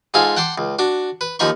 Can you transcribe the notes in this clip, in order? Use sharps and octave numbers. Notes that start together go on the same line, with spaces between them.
G#2 F4 G#4 A4 F5 G#5
F#5 G5 A5 C6 D6
C#2
D4 F#4
B4
D#2 F3 D#4 B5 C#6